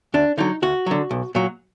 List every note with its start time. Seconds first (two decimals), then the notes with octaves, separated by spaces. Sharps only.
0.14 D2 D4
0.38 D3 F#3 D#4
0.62 D2 F#4
0.86 D3 F#3
1.11 B1
1.35 A#2 F#3